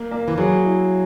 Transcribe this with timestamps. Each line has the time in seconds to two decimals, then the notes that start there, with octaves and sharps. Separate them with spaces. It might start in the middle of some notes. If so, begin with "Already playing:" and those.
Already playing: A#3
0.11 A#3
0.28 E3
0.38 F#3 G#4
0.65 E4